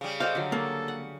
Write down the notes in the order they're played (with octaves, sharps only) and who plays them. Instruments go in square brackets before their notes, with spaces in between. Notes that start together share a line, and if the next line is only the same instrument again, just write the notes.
[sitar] C#3 G3
[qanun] A4 D5 D#5 [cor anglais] C5 [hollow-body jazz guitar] F5
[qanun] D3 F#3
[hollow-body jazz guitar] A#3 [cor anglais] A4
[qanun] F#5